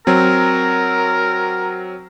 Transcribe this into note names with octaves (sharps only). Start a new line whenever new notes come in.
F#3 C4 A#4